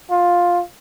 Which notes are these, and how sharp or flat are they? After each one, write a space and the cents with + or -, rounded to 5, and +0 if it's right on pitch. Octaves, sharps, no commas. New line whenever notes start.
F4 +10